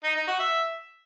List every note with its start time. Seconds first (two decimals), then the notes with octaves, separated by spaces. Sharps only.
0.04 D#4
0.16 D#4
0.28 F#4
0.39 E5